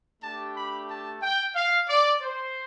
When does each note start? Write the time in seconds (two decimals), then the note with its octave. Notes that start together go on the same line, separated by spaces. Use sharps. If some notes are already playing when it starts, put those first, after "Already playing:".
0.22 A3 D4 G4 A5
0.56 B5
0.89 A5
1.22 G5
1.55 F5
1.88 D5
2.21 C5